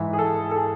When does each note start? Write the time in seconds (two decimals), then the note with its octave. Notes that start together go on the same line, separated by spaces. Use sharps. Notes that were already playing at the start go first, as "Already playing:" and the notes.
Already playing: G#2 E3 E5
0.13 G#4
0.18 A4
0.51 A4
0.56 G#4